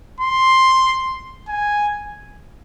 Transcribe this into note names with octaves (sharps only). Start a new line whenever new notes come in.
C6
G#5